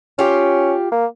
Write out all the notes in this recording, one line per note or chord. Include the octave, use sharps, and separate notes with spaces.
C#4 F4 G4
A#3